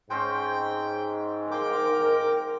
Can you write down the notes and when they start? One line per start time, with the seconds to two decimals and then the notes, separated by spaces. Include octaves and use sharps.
0.10 G#2 G#3 C4 C#4 G5
1.51 A#3 A#4 G5 C6 D6